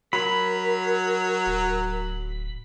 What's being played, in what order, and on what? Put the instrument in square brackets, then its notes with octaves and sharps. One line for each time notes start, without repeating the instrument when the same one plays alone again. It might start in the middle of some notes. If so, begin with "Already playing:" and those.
[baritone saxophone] F#3 [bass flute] A#4 [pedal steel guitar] B5
[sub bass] D1